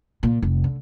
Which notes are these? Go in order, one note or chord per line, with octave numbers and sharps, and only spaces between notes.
A#2
F1
D3